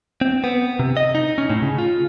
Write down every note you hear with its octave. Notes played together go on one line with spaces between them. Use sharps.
C4
B3
C3
D#5
D#4
C#4
A2
C#3
F4